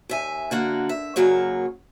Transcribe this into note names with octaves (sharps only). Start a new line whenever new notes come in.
D#2 E5 G#5
D3 A#3 F#4
E5
F#2 C#3 F#3 A#3 C#5